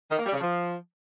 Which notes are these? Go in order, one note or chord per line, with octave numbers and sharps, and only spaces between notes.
D#3
A#3
G3
C#3
F3